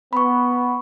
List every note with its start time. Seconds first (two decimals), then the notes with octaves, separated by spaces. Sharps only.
0.13 B3 B5 C#6